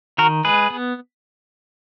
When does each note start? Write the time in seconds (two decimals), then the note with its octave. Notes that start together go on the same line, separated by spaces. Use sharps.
0.18 D#3 F#4 A#4
0.44 G#3 G#4 B4
0.70 B3